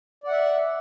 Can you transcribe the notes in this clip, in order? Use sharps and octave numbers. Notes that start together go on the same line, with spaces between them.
D5 E5 F#5